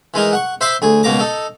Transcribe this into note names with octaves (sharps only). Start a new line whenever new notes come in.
E3 G#3 D#4 A#4
F#5 C#6
C5 E5 B5 C6 D6
D2 G#4
C#2 B2 A#3 A#5 D6
D#4 A4